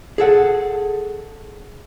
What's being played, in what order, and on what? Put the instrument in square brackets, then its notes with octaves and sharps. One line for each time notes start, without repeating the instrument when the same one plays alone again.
[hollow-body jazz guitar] G#4 A4 F#5